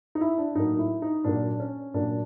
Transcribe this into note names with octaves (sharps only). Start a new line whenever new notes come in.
D#4
E4
D4
A2 F#3 A#3 D#4
E4
D#4
A#2 F#3 A#3 D4
C#4
A#2 F#3 A#3 D4